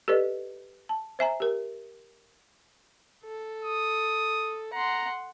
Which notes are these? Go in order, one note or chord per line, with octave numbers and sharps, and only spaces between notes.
G4 A4 B4 D5 D#5
A5
C5 E5 G#5 A#5
G4 A#4
A4
D#6
F#5 A#5 C6